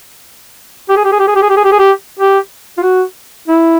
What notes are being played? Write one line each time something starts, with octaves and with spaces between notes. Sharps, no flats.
G4
G#4
G4
G#4
G4
G#4
G4
G#4
G4
G#4
G4
G#4
G4
G4
F4
F#4
E4